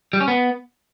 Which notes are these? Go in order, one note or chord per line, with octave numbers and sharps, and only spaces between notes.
G3
C#4
B3